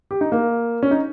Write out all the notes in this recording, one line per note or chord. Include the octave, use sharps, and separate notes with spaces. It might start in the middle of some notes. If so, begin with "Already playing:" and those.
G4
D#4
A#3
C#4
D#4